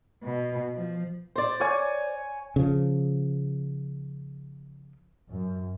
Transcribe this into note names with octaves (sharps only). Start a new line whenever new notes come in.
B2
F3
C5 D5
C#5 G#5
C#3 F3
F#2